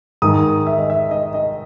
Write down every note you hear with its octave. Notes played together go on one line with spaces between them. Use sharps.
G#2 D#3 D#6
E5
D#5
E5
D#5
D#5